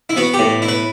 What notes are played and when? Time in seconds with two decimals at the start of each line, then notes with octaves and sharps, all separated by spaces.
0.10 E4
0.16 B3 F#4
0.34 G4
0.39 A2
0.62 E4
0.68 B4